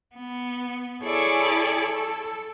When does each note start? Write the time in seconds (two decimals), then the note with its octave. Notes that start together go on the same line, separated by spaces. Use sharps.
0.16 B3
1.03 E4 G#4 A4 C#5 D5 G#5
1.78 A4